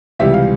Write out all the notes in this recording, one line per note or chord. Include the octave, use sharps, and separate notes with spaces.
C#2 C3 E3 G3 E5
F5